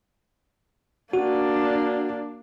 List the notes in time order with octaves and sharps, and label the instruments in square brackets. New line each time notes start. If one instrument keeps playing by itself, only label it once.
[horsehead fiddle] A#3 D4 [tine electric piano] F#4